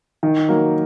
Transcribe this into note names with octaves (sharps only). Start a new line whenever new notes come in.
D#3
F#3 A#3